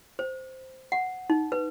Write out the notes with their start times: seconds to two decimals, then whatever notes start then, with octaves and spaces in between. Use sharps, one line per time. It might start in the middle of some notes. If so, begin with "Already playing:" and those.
0.19 C5
0.92 F#5
1.30 D#4
1.52 B4